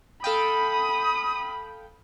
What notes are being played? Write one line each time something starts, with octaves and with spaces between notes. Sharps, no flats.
A4 F5 G5 B5 D#6